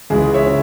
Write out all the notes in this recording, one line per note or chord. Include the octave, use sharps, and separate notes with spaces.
C#2 C#3 E3 G#3 G#4
C#5 E5
C#3